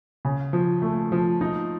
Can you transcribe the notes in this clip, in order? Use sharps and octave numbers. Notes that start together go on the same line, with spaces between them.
C#3
F3
A3
F3
D#4